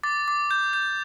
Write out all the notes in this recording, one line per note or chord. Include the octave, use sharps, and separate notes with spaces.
D6 A6
D6
G6
G6